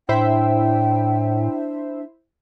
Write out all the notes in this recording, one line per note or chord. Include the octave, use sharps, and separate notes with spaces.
A2 D4 E4 C5 E5 G5